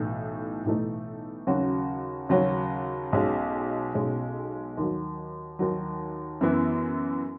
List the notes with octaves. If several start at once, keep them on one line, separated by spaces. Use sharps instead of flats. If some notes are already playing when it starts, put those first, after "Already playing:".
Already playing: B1 A2 E3 A3 D#4
B1 A2 E3 A3 D#4
D#2 C#3 F#3 C#4 F#4
D#2 C#3 F#3 C#4 F#4
B1 B2 G#3 C#4
B1 B2 G#3 C#4
D#2 D#3 F#3
D#2 D#3 F#3
F#2 E3 B3 E4